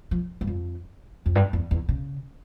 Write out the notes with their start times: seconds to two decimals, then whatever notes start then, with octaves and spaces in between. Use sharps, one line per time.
0.11 F3
0.41 G2
0.47 F2
1.26 F2
1.35 G2
1.53 E2
1.71 E2
1.89 C#3